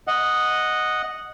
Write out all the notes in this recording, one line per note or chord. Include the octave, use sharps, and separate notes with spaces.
D#5 F#5